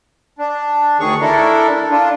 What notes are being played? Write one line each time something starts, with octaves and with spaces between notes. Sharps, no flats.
D4
D2 D#3 G#4 C#5 C#6
D4 E4 A4 A#4
D4 F4